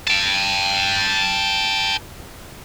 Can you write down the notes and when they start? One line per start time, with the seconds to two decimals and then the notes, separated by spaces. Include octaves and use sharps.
0.08 G5 A5